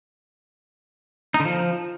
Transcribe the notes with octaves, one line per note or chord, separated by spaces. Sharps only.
D#4
D3
F3